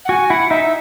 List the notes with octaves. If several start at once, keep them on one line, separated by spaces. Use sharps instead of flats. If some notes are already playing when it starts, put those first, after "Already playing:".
F#5
F#4 G#5
E4 F#5
D#4 E5